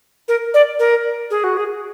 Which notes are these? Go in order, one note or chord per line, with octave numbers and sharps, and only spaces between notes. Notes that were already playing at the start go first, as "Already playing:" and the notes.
A#4
D5
A#4
G#4
F#4
G#4